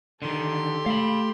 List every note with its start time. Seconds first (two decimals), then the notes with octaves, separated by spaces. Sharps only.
0.22 D3 D#3 G4 A4 C6
0.86 A3 F5 B5